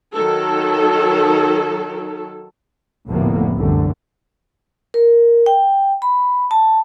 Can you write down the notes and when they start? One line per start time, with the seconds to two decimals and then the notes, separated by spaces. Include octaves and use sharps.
0.13 D#3 F#3 A4
3.09 F1 D2 A2 A#3 B3
3.54 C2 F#2 D3
4.94 A#4
5.46 G5
6.02 B5
6.51 A5